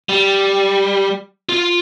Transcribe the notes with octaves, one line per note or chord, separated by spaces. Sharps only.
G3
F4